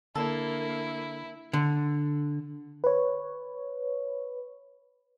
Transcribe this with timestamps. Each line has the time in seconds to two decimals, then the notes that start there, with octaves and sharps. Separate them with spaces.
0.15 D3 A#3 E4 A4
1.53 D3
2.84 B4 C#5